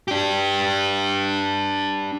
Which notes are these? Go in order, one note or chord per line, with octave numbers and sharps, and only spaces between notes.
D4 G4